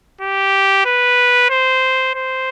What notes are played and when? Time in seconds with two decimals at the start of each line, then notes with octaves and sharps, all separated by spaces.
0.21 G4
0.85 B4
1.50 C5
2.14 C5